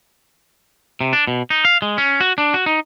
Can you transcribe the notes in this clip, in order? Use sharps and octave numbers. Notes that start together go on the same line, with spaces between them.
C3
D4
B2
D#4
F5
G#3
C#4
F#4
D4
F#4
D#4